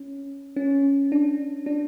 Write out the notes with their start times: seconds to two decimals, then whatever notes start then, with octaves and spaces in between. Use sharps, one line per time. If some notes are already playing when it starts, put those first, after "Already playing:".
Already playing: C#4
0.56 C#4
1.12 D4
1.66 D4